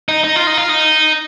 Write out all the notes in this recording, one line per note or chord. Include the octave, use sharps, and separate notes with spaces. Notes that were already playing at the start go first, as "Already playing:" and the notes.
D#4
D#4
F4
D#4
F4
D#4